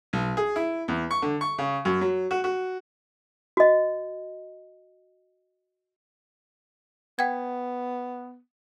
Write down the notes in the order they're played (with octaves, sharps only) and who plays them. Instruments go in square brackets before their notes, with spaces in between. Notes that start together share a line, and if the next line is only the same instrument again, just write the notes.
[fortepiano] B1
G#4
E4
E2
C#6
D3
C#6
C#3
F#2
F#3
F#4
F#4
[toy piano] F#4 D#5
[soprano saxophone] B3 [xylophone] F#5 G5 G#6